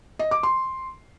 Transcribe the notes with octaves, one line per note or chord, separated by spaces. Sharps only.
D#5
D6
C6